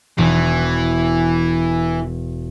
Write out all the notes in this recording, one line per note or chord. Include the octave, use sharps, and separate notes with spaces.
E1 E3